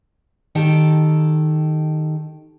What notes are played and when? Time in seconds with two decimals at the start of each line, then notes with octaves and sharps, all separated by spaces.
0.55 D#3 G4 A4